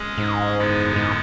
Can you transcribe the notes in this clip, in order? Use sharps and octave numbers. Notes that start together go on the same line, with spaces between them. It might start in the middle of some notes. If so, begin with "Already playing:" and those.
Already playing: G#3 C#4 G#4
G#2
F#2 D3 G#3 B3 E4
G#2